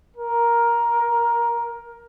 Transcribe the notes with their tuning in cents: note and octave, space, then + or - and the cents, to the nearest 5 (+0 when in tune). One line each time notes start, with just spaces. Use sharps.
A#4 +10